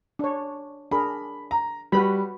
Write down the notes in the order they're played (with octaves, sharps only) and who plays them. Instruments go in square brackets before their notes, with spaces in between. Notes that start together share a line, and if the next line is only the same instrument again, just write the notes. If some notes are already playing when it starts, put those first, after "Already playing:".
[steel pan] D4 C#5
[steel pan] D4 G#4 A#4 [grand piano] B5
[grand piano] A#5
[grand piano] G3 [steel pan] F#4 B4 B5